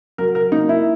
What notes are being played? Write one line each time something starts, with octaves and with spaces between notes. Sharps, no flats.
F#3 A#4
A#4
A#3 D#4
E4